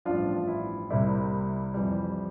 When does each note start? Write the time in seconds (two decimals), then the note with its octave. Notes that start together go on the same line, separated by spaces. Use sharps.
0.05 A1 G2 F3 D4 F4
0.47 E4
0.90 C2 C3 G3 A#3 E4
1.74 F2 E3 G3